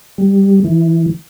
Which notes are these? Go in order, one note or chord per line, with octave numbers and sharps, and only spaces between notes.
G3
E3